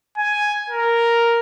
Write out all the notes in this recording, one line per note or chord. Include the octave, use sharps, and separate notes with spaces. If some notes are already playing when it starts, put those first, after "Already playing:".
G#5
A#4